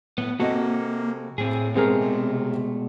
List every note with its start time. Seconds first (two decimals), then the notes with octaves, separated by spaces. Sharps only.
0.18 A2 B3
0.40 C3 A#3 C4 F#4 A4 D#5
1.38 A2 C4 G#4
1.75 B2 G#3 A3 C4 G#4 A#4
2.01 C3